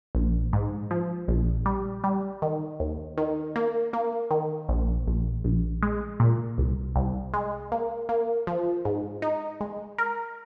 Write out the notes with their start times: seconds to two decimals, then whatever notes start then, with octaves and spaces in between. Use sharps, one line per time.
0.15 A#1
0.53 G#2
0.91 F3
1.28 A#1
1.66 G3
2.04 G3
2.42 D#3
2.80 D#2
3.18 D#3
3.56 A#3
3.93 A#3
4.31 D#3
4.69 A#1
5.07 A#1
5.44 A#1
5.83 G#3
6.20 A#2
6.58 C2
6.96 C2
7.34 G#3
7.72 A#3
8.09 A#3
8.47 F3
8.85 G#2
9.22 D#4
9.61 G#3
9.99 A#4